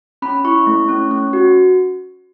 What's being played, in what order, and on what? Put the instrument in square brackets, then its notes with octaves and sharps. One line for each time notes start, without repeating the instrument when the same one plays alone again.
[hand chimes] C#4 B5
E4 C#6
A3
C#4
C#4
F#4